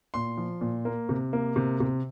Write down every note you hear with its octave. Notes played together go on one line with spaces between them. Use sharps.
A#2 C6
F3
A#2
A#3
C3
A#3
C3
C3